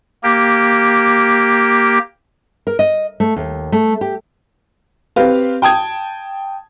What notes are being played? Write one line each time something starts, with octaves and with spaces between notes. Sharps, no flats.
A#3 G4
A#4
D#5
A3
D#2
A3
G4
C4 G4 B4 F5
G5 A5 D#6 G#6